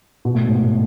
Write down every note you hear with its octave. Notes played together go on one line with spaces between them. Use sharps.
B2
A2
G#2
A2